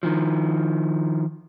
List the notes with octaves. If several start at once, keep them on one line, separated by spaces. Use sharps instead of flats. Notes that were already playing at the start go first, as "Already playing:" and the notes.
D#3 F3